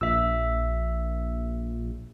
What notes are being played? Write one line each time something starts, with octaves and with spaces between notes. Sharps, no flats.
A#1 E5 E6